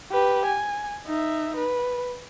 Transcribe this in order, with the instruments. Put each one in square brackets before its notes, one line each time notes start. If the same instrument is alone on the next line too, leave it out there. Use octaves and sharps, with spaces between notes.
[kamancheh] G4 B4
G#5
D#4 E5
B4